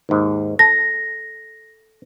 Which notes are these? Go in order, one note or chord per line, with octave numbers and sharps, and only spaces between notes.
D#2 G#2
A4 A#6